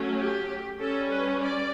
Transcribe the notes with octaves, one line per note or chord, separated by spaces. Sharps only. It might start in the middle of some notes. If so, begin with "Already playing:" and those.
Already playing: F#3 A3 C#4
G4
G3 C#4 A4
B4
D5